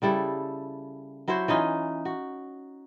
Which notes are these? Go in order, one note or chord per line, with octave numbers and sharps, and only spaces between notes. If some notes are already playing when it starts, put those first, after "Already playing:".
C#3 G3 E4 A4
F#3 E4 F#4 C5
E3 C#4 D#4 F4
F#4